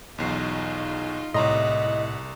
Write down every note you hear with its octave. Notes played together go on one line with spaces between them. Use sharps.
B1 E2 D#4 F4 C7
C2 A2 E4 D#5 F#5 A#5 C6